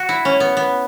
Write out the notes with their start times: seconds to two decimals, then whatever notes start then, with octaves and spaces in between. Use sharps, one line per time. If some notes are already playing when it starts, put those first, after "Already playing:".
Already playing: F#4
0.09 E4
0.25 C#4
0.40 B3
0.57 B3